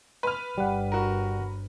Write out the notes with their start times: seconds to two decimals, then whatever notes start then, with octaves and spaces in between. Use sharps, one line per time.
0.23 B4 F6
0.58 G1 G3 F#5
0.92 F#4 A#4